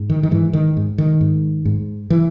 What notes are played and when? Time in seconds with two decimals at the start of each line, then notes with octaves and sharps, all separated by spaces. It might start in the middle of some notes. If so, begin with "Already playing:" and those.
Already playing: G#2
0.10 D#3
0.23 D#3
0.31 G#2 E3
0.53 D#3
0.77 G#2
0.98 D#3
1.21 G#2
1.65 G#2
2.10 E3